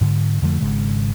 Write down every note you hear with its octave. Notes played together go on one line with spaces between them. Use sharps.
G#2 D3
F2 D3 F3 A3
G#1 G#2 C#3 G#3